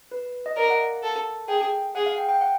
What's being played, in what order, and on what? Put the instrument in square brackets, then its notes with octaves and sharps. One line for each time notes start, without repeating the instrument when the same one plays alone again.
[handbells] B4
D#5
[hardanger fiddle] A#4 [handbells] D5
[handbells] F#5
F5
[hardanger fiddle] A4
[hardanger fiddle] G#4 [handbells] G5
[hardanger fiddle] G#4 [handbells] F#5
[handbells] F5
G5
G5
F#5